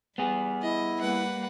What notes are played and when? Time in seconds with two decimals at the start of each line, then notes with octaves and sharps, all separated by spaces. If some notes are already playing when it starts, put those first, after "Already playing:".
0.18 G3 B3 G#4
0.62 E4 D#5
1.00 G3 A#3 B4 F#5